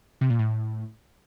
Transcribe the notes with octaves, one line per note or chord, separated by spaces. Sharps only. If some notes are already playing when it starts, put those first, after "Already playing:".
C3
A#2
A2